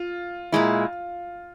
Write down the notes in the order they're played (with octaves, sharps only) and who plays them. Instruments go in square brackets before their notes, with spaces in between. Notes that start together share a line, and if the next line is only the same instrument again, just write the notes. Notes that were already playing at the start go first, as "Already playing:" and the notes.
Already playing: [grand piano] F4
[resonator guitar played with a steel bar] A#2 G#3 E4